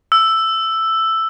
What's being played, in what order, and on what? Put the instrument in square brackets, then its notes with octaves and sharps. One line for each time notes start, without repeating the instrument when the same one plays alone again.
[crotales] E6